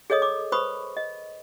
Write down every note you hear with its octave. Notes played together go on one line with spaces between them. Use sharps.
G#4 A4 C#5 D#5 D#6
D6
B4 C5 B5 C#6 D#6
D#5